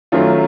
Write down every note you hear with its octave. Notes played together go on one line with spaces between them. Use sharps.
F#2 D#3 F#3 A3 F4